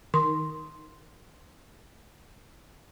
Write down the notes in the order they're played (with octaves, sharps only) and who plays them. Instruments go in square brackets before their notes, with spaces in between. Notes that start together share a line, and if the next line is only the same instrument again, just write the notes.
[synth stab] D#3 [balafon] C6